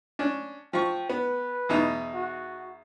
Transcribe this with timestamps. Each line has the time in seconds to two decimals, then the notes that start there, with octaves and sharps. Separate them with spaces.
0.19 C#4 D4
0.73 F3 G5 C#6
1.10 B3 B4
1.69 E2 B2 D#4
2.14 F#4